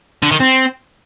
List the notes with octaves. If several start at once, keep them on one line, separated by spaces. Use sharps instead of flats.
D3
D#3
C4